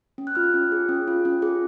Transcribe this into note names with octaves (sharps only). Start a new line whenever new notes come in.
C#4
F#6
F4 F6
F#6
C#4
G#4
C#4
F4
C#4
G#4